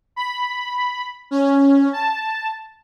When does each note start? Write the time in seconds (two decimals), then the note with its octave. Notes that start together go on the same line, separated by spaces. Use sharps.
0.16 B5
1.31 C#4
1.93 A5